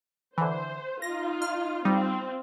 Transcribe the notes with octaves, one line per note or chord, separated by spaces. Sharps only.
D3 E3 C5
D#4 F4 A#6
F6
G3 C4 D#4 F4